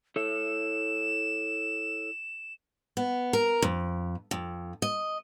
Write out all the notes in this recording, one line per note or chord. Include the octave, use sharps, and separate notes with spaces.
E4 A4 C#5 E7
B3
A#4
F2
F2
D#5